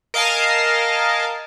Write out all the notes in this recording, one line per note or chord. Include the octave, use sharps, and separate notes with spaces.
A#4 D#5 F5 G#5 A5